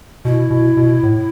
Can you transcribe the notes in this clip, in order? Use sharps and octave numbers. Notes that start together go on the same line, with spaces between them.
B2 E4
B2
B2
A2